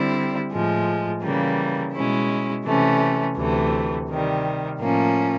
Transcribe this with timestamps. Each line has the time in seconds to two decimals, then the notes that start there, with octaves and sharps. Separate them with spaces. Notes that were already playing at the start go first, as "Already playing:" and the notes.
Already playing: D3 G3 C4 E4
0.50 A2 F3 G#3
1.23 C#3 E3 G3 A#3
1.93 B2 G#3 C#4 E4
2.64 C3 E3 A3 C#4
3.36 D2 C3 E3 A3
4.08 C3 D#3 G3
4.80 A2 F3 A#3 C#4